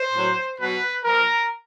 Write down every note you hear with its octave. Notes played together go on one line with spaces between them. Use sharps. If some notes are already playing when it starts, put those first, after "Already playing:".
Already playing: C5
A2 F#3
B2 F#3 B4
A#2 F3 A#4